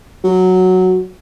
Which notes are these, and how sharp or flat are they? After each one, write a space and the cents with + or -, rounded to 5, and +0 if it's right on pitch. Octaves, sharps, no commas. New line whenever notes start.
F#3 -5